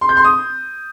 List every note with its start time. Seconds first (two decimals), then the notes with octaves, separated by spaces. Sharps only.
0.01 C6
0.09 G6
0.17 C6
0.24 D#6